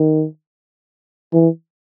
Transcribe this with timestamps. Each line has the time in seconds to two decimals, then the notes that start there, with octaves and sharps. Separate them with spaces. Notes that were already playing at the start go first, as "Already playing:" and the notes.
Already playing: D#3
1.33 E3